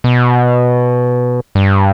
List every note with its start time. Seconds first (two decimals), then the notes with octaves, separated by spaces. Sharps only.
0.04 B2
1.55 G2